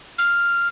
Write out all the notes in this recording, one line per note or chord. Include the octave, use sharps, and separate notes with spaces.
F6